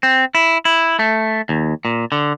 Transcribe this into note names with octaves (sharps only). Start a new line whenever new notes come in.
C4
E4
E4
A3
D#2
A#2
D3